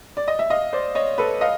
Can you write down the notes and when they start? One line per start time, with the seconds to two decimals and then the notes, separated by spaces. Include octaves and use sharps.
0.17 D5
0.28 D#5
0.39 E5
0.50 D#5 F5
0.73 C5 D5
0.95 C#5 D#5
1.18 A4 B4
1.41 D#5 F5